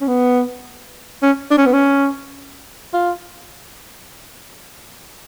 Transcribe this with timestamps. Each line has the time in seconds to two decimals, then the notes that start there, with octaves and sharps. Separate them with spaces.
0.01 C#4
0.07 B3
1.22 C#4
1.51 D4
1.58 C#4
1.66 B3
1.73 C#4
2.94 F4